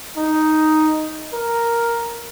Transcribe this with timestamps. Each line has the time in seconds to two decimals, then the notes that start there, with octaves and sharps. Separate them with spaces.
0.17 D#4
1.33 A#4